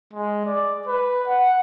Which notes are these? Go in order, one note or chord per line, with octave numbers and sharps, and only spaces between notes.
G#3
D5
B4
F#5